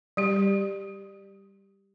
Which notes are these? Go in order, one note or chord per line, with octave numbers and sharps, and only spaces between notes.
G3 G4